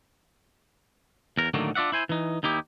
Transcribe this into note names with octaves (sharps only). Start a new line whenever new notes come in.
E2 A#4
A2 D3 D#3 F#3 A3 A#3
D4 F4 D5 E5 F#5
E4 C5 G#5
E3 D#4
D#2 D#4 E4 G4